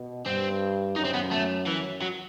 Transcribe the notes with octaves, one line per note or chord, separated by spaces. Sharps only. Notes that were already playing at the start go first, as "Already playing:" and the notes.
Already playing: B2
G2 C4
F#2 D#4
C4
B3
A3
F#2 E3
F#3